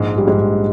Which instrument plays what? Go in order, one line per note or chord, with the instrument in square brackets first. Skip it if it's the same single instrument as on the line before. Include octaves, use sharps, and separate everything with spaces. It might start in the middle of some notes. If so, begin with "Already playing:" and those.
Already playing: [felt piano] A#1 G#2 G#3
A#1 G3
G#2 G#3
A#1